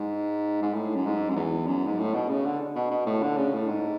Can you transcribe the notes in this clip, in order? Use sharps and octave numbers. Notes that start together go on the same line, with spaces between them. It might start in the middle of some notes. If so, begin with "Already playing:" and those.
Already playing: G#2
G#2
A2
F#2
G#2
F#2
E2
F#2
G#2
A2
B2
C#3
D3
B2
B2
A2
D3
C#3
A2
G#2